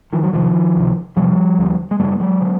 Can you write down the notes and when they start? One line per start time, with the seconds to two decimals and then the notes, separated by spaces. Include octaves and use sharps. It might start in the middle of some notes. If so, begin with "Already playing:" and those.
0.13 D#3 F3
0.23 F#3
0.33 E2 C3 D#3 F3
0.75 C#2 C3
1.16 E2 C3 F3 G3
1.58 D#2 D3
1.91 G#3
2.00 F#2 C#3 G3 A3
2.20 F#3 G#3
2.41 D3